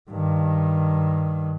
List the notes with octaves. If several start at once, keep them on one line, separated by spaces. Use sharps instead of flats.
G2 D#3